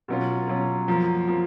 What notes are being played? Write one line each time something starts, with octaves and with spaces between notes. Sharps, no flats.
B2 F#3 C#4 F4
B2 F#3 C#4 F4
F#2 F3 A#3
F3 A#3